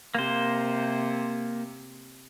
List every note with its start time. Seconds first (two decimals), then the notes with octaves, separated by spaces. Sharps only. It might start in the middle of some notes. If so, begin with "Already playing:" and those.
0.15 C3 A#3 C5